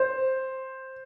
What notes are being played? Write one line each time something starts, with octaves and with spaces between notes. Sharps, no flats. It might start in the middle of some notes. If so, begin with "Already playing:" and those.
Already playing: C5